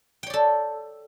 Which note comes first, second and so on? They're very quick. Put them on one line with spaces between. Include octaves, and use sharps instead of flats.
G5 C#5 D5 A4